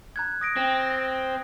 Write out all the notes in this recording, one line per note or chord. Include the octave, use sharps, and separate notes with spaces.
A#5 F#6 G#6
D#6 A#6 D7
C4